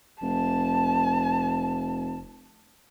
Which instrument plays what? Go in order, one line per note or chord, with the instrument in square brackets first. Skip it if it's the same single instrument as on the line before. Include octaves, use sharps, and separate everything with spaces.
[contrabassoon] F1 [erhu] A5